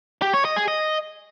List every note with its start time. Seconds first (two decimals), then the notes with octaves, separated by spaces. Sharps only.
0.22 G4
0.33 C#5
0.45 D#5
0.56 G#4
0.68 D#5